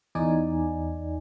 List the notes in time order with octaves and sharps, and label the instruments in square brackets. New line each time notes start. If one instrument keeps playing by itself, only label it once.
[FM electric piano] E2 D#4 D5 G#5